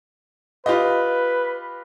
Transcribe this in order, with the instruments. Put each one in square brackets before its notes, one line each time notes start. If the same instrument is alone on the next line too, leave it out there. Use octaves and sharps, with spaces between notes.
[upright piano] F4 G4 D#5 [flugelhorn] B4